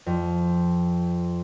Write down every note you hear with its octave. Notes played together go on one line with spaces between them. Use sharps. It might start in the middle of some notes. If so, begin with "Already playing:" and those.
F2